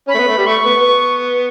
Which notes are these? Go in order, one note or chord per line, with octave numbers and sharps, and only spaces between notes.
C#4 B5
A3
B3
A3
G3
A3 C#6
B3
B3